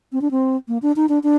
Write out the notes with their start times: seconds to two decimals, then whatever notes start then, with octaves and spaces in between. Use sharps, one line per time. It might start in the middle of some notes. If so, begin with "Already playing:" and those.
0.12 C4
0.22 D4
0.31 C4
0.68 A#3
0.82 D4
0.96 D#4
1.09 D4
1.23 D4